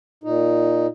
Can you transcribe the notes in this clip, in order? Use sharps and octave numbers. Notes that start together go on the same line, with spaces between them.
A#2 D#4